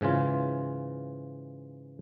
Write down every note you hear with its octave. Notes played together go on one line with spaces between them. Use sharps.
G#2 C#3 E3 F4